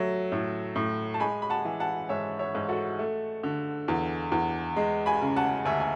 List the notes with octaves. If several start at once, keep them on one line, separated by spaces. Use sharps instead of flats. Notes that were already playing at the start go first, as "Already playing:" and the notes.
Already playing: F#3 A3 E5
A2
A2
A5
G#3 G#5 B5
B5
F#5 A5
E3
F#5 A5
G#2 C#5 E5
C#5 E5
G#2
F#4 A4
A3
D3
E2
E2
G#3
G#5 B5
C#3
F#5 A5
D2 E5 G#5
G#5